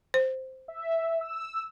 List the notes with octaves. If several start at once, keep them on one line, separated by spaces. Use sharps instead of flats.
C5
E5
E6